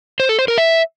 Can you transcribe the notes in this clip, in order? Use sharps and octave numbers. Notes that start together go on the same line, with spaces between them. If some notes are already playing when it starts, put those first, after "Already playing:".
C5
A4
C5
A#4
E5